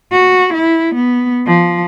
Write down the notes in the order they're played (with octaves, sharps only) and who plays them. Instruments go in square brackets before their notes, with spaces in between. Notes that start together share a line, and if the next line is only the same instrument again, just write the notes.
[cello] F#4
E4
B3
F3